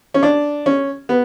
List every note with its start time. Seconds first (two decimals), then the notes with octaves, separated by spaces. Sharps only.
0.14 C#4
0.23 D4
0.66 C#4
1.09 B3